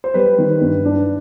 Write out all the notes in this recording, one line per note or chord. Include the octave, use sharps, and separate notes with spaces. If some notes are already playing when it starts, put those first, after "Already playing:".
C5
G3 B4
D#3
G2
D4